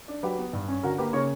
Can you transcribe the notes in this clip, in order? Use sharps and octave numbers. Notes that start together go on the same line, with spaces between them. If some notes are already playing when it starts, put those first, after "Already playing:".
D4
F#3 G4 B4
B3
G2
C#4
D3 F#4 A#4
A#3 G4 B4
C#3 A#4 C#5